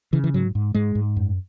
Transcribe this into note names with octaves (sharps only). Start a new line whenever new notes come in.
C#3 E3
E3
G#2 F#3
G#2
G#2 G#3
G#2
F#2